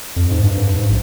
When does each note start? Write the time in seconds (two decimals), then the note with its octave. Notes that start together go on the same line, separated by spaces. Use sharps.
0.16 F2
0.31 G#2
0.44 G2
0.57 G2
0.75 G#2
0.89 A#1